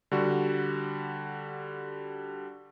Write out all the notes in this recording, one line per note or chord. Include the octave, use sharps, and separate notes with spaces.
D3 G3 F#4